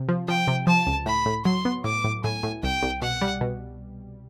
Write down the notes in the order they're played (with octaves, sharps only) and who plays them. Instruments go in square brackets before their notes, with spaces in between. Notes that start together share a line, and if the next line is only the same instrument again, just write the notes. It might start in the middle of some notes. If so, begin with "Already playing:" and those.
Already playing: [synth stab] C3
F3
[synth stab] F3 [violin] G5
[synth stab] C3
[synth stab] F3 [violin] A5
[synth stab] C#2
[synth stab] A2 [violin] B5
[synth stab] A2
[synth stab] F#3 [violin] C6
[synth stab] B3
[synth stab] A2 [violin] D6
[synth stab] A2
[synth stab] A2 [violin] G#5
[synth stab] A2
[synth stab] C2 [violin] G5
[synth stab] C2
[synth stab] B2 [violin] F#5
[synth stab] G3
B2